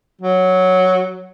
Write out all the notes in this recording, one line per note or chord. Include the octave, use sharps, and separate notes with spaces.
F#3